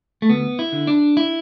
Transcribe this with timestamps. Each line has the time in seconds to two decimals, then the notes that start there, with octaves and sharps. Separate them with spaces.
0.22 A3
0.30 D2 B3
0.59 E4
0.72 D3
0.87 D4
1.17 E4